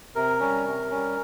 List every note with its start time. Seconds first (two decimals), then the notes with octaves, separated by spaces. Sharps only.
0.15 C3 A#4
0.40 G3 C#4
0.66 C3
0.90 G3 C#4